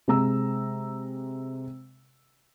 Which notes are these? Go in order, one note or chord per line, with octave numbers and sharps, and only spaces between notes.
C3 G#3 A#5 E6